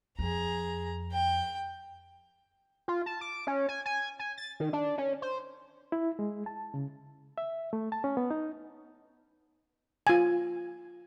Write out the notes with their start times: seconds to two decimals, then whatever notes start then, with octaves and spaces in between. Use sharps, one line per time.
0.19 F2 G#4 A#5
1.13 G5
2.88 F4
3.06 A5
3.21 D6
3.47 C#4
3.69 G#5
3.86 G#5
4.19 G#5
4.38 A6
4.60 D#3
4.73 D4
4.98 C#4
5.22 C5
5.92 E4
6.19 G#3
6.46 A5
6.74 C#3
7.38 E5
7.73 A3
7.92 A5
8.04 C#4
8.17 B3
8.31 D#4
10.07 F4 G#5